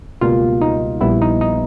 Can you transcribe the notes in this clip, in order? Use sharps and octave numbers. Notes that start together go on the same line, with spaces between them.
C#2 B2 G3 A#3 F4
D#4
A#1 A#2 G3 B3 E4
D#4
D#4